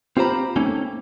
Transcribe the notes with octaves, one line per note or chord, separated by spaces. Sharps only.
C4 F4 G4 C5 A#5 B5
A3 A#3 C4 C#4 D#4